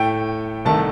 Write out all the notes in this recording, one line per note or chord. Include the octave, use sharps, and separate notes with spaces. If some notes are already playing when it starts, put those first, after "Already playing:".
Already playing: A2 A3 G5
C2 C3 D#3 A3 A5